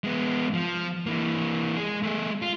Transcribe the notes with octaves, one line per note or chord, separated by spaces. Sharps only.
G#3 B3
F3
E3 A#3
G#3 G#4
A3 G#4
F4